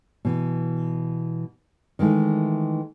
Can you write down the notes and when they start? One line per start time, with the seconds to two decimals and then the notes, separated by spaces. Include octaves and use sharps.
0.25 B2 E3
1.99 D#3 E3 G#3 A3